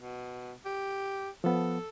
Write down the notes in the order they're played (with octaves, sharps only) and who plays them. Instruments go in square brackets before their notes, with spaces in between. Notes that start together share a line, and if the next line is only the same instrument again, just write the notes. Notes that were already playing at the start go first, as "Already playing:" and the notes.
[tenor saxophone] B2
G4
[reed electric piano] F3 B3 [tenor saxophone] A4